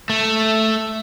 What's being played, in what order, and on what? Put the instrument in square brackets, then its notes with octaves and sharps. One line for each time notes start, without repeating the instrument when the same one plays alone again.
[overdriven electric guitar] A3